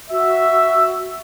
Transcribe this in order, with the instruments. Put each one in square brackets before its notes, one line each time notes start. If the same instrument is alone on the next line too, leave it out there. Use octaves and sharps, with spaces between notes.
[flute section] F#4 E6 [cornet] E5